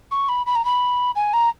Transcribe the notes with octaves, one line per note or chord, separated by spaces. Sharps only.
C#6
B5
B5
A#5
B5
G#5
A#5